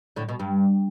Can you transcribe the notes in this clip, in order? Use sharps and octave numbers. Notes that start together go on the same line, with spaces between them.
A2 D3
B2
G2